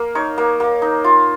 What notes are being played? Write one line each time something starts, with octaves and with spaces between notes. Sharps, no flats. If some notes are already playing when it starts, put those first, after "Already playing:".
Already playing: A#3
D#4 C#5
A#3
A#3
D#4
F4